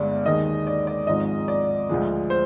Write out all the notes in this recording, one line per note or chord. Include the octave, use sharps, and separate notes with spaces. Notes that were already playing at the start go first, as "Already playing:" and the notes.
Already playing: G1 G2 D3 G#3 D5
D#2 D#3 G#3 D#5
D5
D5
G#1 G#2 F3 G#3 D#5
D5
D2 D3 F3 G#3
C5